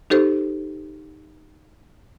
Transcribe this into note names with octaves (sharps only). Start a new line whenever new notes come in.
D#4 G4 A4 C5